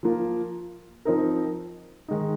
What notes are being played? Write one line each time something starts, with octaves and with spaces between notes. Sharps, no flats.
F3 A#3 F4
F3 C4 D#4 A#4
D#3 G#3 D#4